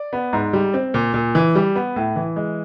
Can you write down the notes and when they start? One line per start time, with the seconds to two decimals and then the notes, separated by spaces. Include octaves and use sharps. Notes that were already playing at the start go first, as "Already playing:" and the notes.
Already playing: D5
0.13 B3
0.33 G#2
0.53 G3
0.74 C4
0.94 A#2
1.14 A#2
1.35 E3
1.55 G3
1.75 B3
1.96 A2
2.16 E3
2.36 G#3